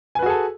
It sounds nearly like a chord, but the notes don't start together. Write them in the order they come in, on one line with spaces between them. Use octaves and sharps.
G#5 B4 F#4 G#4 A4